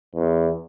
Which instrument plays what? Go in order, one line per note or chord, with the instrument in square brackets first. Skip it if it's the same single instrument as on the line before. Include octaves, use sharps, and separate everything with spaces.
[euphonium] E2